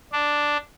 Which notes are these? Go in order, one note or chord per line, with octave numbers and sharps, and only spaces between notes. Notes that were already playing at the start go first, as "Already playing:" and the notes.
D4